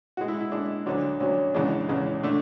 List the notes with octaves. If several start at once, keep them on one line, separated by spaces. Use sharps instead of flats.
A2 G#3 F#4
E4
E4
A2 G#3 D4
D2 D3 F#3 D4
D2 D3 F#3 C#4
E2 C#3 E3 G#3 D4
E2 C#3 E3 G#3
D3 A3 D4